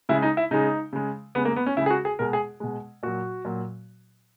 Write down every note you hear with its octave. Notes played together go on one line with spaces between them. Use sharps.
C#3 G#3 E4
D#4
E4
C#3 G#3 D#4
C#3 G#3
C#3 G#3 B3
A#3
B3
C#4
C#3 G#3 E4
G#4
F#4
G#4
B2 G#3 A#4
G#4
B2 G#3
A#2 F#3 F#4
A#2 F#3